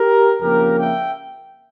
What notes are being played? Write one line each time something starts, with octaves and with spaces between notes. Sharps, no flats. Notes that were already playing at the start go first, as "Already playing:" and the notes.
Already playing: G4 A#4
F2 C#3 F3 A#3 C#4 G4 A#4
E5 G5